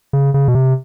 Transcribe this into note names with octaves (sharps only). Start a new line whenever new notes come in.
C#3
C#3
B2
C3